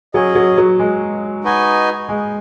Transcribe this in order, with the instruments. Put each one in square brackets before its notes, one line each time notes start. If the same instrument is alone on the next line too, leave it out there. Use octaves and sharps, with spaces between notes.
[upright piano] F#3 [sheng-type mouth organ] C#4 G#4 D#5
[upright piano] F#3
F#3
G#3
[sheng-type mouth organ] D#4 F#4 B4 D#5 G#5
[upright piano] G#3